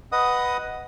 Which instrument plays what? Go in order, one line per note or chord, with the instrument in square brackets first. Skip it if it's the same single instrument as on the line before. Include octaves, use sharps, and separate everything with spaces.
[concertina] B4 D#5 F#5 D#6